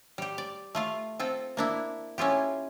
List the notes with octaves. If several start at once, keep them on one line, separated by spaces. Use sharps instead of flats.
G3 G4
D5
A3 F4 F5
C4 F4 A4
A#3 D4 E4
C#4 E4 F4 G4